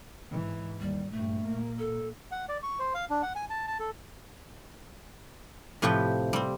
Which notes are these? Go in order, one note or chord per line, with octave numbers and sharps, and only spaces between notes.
G#2 E3
D#2 G3
A#1 G2 A3
A#2 A#3
A4
F#5
D5
C#6
C5
F5
D4
F#5
G#5
A5
A5
A4
A2 C3 F3 G4 B4 G5
G3 C4